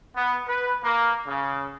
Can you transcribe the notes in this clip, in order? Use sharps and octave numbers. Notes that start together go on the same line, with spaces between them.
B3
B4
A#3
C#3